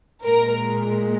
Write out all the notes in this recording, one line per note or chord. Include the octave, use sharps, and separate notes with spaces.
A#2 G#3 A#4